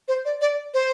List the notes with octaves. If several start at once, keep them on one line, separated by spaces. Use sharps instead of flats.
C5
D5
D5
C5